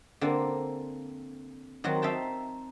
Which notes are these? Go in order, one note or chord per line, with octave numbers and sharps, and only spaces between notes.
D3 A#3 C4
D#3 F#3 C4 F#4
D#4 E5 F5 G5 A5